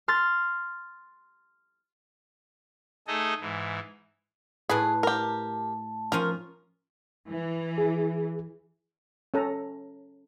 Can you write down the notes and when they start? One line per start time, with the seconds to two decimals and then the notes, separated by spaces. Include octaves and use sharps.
0.08 C6 F6 A6
3.08 A3 D#4 G#4 A4 D#5
3.41 G#2 E3
4.69 A2 G#4 B4 A5 B5
5.03 G4 A#4
6.12 F3 C#4 F4 A#4
7.30 E3
7.78 G#4
9.34 C#4 A4 A#5